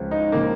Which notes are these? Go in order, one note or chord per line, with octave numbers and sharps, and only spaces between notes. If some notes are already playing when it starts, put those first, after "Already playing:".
Already playing: C#2 C#3 F3
D#4
C#3 F3 A#3